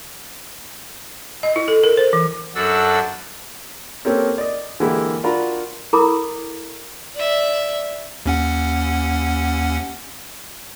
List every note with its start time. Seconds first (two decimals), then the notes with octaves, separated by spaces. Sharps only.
1.43 D#5
1.56 E4
1.68 A4
1.84 A#4
1.97 C5
2.13 E3
2.55 F#2 D4 F#4 A4 E6
4.05 A#3 C4 C#4 G4 A4 A#4
4.38 D5 D#5
4.80 D3 E3 G#3 A#3 E4 G4
5.24 D4 F4 F#4 A#4 A#5 B5
5.93 E4 A4 A#4 A#5 B5 D6
7.15 D5 E5
8.26 D#2 C#4 F#5